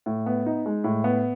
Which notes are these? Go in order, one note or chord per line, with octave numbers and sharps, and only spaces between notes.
A2
B3
D#4
G#3
A2
B3